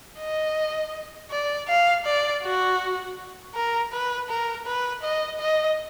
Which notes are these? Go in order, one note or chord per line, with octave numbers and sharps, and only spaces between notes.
D#5
D5
F5
D5
F#4
A#4
B4
A#4
B4
D#5
D#5